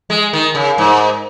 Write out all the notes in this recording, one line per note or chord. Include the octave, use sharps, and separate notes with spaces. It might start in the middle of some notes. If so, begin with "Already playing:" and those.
G#3
D#3
C#3
G#2